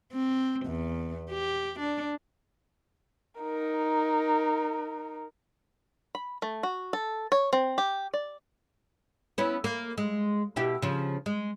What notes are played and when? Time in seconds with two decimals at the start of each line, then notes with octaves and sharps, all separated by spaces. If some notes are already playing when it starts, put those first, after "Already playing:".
0.13 C4
0.66 E2
1.31 G4
1.80 D4
3.40 D#4 A#4
6.15 B5
6.42 A3
6.63 F#4
6.93 A4
7.32 C#5
7.53 C4
7.78 G4
8.14 D5
9.38 B3 C#4 E4
9.64 A#3
9.98 G#3
10.56 B2 E4 G4
10.82 C#3 F3
11.26 G#3